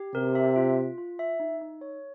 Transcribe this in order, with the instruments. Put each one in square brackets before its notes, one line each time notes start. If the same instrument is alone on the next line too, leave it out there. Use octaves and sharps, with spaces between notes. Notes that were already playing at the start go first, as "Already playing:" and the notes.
Already playing: [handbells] G4
[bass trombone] C3 [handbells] A#4
[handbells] E5
F4
F4
F4
E5
D#4
D#4
C#5